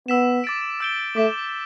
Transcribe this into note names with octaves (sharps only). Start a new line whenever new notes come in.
B3 E6 B6 E7
D6 A6 D7
E6 G6 D7 G7
A3 D6 B6 E7